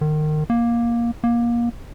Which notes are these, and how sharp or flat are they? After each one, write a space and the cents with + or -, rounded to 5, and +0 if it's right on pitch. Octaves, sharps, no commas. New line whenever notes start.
D#3 -30
A#3 +15
A#3 +25